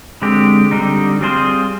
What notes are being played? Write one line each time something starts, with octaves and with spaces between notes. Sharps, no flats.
D3 G#3 C4 G4
D3 G3 C4 D#4
G3 C4 F4 G#4 C5